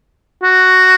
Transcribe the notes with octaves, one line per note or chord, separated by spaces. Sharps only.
F#4